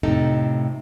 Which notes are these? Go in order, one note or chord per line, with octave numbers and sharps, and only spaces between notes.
F2 A2 C3 D#4 A4